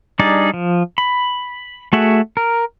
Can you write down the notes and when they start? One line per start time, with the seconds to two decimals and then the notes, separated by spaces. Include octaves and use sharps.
0.19 G3 D4 D#4 G#4 D5
0.54 F3
0.98 B5
1.93 A3 F#4 G#4 E5 F#5
2.37 A#4